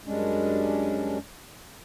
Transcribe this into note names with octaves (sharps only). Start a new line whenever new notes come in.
F#2 G3 G#3 C#4 D4